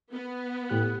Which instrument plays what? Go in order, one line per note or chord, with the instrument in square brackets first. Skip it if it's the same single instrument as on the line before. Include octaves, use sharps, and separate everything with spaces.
[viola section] B3
[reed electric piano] A2 G4 F#6